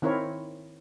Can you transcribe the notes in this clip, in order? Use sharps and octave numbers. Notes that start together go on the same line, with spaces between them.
D#3 C4 E4 A#4 C#5